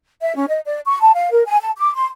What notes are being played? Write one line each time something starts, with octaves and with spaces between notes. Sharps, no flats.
E5
C#4
D#5
D5
C#6
A5
F5
A#4
G#5
A5
D6
C6